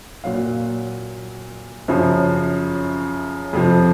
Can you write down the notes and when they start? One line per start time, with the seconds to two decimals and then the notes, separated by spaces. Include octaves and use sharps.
0.24 A#2 F#3 F5
1.88 F#2 C#3 F3
3.53 F2 C3 F3